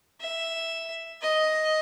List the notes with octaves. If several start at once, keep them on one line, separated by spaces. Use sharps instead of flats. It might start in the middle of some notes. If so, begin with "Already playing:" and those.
E5
D#5